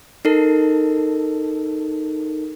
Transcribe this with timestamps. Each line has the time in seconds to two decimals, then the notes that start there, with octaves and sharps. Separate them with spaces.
0.25 D#4 A4 A#4